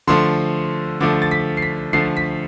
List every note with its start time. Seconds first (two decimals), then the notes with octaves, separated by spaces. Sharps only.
0.07 D3 F3 A3 C6
1.00 D3 F3 A3 D6
1.22 A6
1.31 B6
1.57 C7
1.62 B6
1.93 D3 F3 A3 C7
2.17 B6